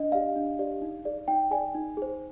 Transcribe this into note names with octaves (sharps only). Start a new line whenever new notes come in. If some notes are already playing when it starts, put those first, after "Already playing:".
Already playing: D4 D#5
G4 D5 F5
D4
G4 D5
D#4
G#4 D5
D#4 G5
G#4 D5 G#5
D#4
G#4 C5